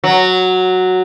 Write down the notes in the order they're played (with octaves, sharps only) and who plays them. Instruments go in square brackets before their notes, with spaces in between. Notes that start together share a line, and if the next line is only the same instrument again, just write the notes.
[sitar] F#3